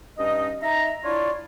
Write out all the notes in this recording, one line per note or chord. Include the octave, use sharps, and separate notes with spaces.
G2 C#4 D#4 D#5
D#4 E5 A#5
D4 E4 F4 C#5 D5